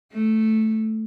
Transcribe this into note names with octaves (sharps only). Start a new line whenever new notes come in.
A3